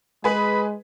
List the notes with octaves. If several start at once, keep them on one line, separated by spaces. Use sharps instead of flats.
G#3 G#4 B4 B5